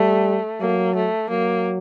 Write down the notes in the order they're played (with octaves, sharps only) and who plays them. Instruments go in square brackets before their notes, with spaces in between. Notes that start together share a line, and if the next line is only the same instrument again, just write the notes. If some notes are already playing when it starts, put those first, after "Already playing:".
Already playing: [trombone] G3 [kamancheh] A3
[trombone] F#3 [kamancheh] A#3
[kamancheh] A3
[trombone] F#3 [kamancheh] A#3